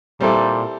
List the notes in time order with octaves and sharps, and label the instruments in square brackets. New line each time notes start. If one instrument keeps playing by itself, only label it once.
[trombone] A#2 [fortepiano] G3 C4 E4 A4